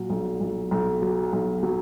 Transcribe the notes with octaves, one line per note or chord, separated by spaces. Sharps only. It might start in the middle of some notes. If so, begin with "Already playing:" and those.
Already playing: A#2 F#3
B1
B1
B1
F#3
B1
F#3